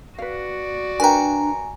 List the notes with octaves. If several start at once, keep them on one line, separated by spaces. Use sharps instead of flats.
F#4 B4 D5 F5
D4 A#4 B4 G5 G#5 A#5